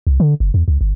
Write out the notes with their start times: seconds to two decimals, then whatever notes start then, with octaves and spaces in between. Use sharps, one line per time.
0.07 C2
0.20 D3
0.40 F#1
0.54 E2
0.68 C#2
0.81 G1